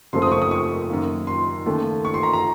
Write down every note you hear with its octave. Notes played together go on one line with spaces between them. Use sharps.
F#1 F#2 F3 A3 C4 C6
D#6
C#6
D#6
C#6
F#2 D#3 A#3
C6
D#2 C#3 A3
C#6
C6
A#5
A#5